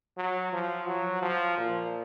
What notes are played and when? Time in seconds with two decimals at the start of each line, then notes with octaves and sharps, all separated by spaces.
0.17 F#3
0.53 F3
0.87 F#3
1.22 F3
1.57 A#2